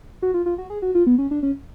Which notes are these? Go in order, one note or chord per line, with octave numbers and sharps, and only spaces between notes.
F#4
F4
F4
F#4
G#4
F#4
F4
B3
C#4
D4
C#4